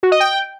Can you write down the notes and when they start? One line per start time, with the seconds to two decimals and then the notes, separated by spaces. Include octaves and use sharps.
0.03 F#4
0.12 D#5
0.20 G5